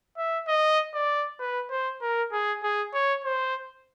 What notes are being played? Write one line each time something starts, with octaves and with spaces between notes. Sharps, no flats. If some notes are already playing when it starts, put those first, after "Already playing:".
E5
D#5
D5
B4
C5
A#4
G#4
G#4
C#5
C5